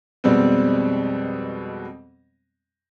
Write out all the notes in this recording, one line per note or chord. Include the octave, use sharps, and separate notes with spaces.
F2 B2 G3 G#3 B3 C4